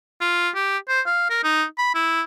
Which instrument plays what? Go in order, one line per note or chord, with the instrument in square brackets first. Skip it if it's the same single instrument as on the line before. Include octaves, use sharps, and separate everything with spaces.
[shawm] F4
G4
C5
F5
A#4
D#4
B5
E4